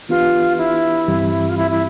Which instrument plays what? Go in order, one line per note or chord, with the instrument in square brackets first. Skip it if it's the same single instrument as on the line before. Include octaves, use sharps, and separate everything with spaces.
[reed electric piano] E3 B3 D4 G4 B4 [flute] F4
[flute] E4
[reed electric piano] G2 E3 G3 C4 G4
[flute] F4
E4
E4